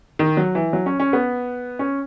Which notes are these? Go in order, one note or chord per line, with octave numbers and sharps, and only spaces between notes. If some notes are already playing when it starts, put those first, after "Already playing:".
D#3
F#3
E3
F#3
C#4
C#4
B3
C#4